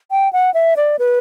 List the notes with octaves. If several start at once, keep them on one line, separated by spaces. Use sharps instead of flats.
G5
F#5
E5
D5
B4